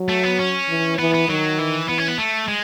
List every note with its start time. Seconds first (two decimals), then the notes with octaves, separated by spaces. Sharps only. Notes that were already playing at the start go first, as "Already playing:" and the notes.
Already playing: F#3
0.09 A3
0.24 B3
0.39 C#4
0.68 E3
0.99 E3 B3
1.14 B3
1.28 D#3 F#3
1.59 E3
1.88 E3 B3
1.98 C#4
2.08 B3
2.18 A3
2.48 G#3